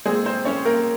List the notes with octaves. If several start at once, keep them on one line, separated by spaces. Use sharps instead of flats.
A#2 G#3 C4 G#4
C4 C5
C#4 C#5
A#3 A#4